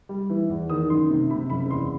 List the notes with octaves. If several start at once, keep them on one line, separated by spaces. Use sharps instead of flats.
G3
E3
E2
D#3 D#6
F#1 C6
C3
C3 B5
F#1 B5
E2 C6